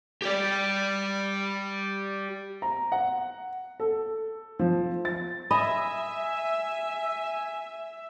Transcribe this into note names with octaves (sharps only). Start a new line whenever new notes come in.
G4 D5
A#5
F#5
A4
F3
A6
D#5 E5 G#5 B5